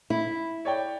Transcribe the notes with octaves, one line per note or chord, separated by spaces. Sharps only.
E4
C#5 D5 G5